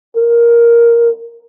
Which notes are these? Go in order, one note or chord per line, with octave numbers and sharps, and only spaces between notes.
A#4